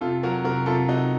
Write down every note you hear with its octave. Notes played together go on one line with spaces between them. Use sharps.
C3 F4 A4
F#3 F#4 A#4
C3 F#4 A#4
C3 F4 A4
C3 D#4 F#4